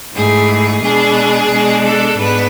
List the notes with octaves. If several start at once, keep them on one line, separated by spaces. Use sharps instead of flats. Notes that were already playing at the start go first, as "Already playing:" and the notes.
G#2 E3 A3 G#4
B2 G#3 D4 G#4
B2 G#3 D4
A4
G#2 G#3 B3 D4 B4